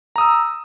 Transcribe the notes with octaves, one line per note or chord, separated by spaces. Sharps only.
A#5 D#6 E6